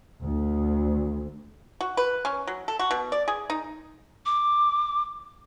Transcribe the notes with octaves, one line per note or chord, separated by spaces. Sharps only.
D2
F#4
B4
C#4
F#3
A4
F#4
B2
D5
G#4
D#4
D6